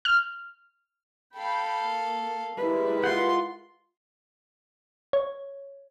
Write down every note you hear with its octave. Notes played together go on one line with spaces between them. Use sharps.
F6
A4 F5 G5 B5
A#3
G3 G#3 E4 A#4 B4
F4 F#5 C6
C#5